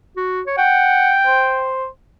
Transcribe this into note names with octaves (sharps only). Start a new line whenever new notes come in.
F#4
C#5
F#5 G5
C5